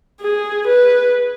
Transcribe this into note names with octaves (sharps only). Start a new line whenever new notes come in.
G#4
B4